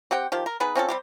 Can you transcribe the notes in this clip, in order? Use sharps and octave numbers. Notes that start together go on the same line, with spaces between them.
C4 G4 F#5 G5
D#3 F3 G4
A#4
B3 D#4 G#4 B4
C4 C#4 F4 A4
G3 C4 G4